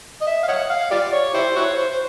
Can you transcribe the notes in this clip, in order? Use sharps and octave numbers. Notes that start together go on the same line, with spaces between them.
D#5
E5
F5
C#5 D#5 F#5
F5
F4 G4 D5
C#5
E4 G4 C5
E4 F#4 C#5
C5
C5